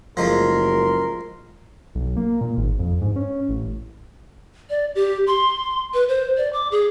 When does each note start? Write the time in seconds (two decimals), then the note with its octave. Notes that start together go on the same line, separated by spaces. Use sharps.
0.17 F#1 F3 G#3 A3 A#4 C6
1.95 B1
2.17 A#3
2.41 A#2
2.58 G#1
2.79 F2
3.01 G#2
3.16 C#4
3.49 A1
4.70 D5
4.95 G4
5.27 C6
5.94 B4
6.09 C5
6.37 D5
6.53 D6
6.72 G#4